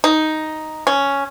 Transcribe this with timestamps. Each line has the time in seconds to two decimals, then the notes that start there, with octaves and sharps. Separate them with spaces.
0.04 D#4
0.87 C#4